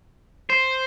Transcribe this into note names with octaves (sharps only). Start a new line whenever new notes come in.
C5